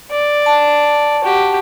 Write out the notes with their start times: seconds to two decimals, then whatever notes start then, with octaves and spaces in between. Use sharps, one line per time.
0.12 D5
0.46 A5
1.23 F#4 G4